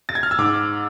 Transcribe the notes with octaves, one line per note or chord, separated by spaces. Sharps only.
A6
G#6
F6
E6
G#2 D6